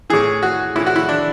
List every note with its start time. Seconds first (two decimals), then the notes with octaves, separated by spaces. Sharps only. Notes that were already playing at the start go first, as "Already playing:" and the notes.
0.10 A2 E3 G#4
0.43 F#4
0.75 A2 E3 E4
0.87 F#4
0.96 E4
1.09 D4